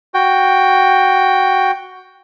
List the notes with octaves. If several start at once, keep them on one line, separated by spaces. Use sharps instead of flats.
F#4 G5